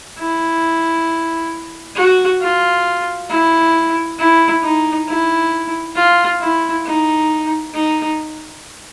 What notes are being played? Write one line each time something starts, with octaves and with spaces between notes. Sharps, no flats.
E4
F#4
F4
E4
E4
D#4
E4
F4
E4
D#4
D#4